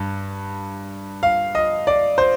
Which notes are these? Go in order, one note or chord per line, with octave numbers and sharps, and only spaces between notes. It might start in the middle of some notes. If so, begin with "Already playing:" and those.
Already playing: G2
F5
D#5
D5
C5